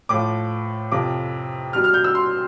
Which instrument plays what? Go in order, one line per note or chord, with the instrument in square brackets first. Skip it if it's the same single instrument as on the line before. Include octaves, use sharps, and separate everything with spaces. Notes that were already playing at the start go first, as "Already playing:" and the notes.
[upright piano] A2 F3 D6
F2 C3 F3 D6
B2 G3 F6
F6
G6
E6
C6